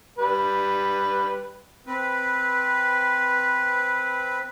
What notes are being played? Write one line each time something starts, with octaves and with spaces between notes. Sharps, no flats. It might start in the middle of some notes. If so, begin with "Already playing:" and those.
G3 B4
C4 B4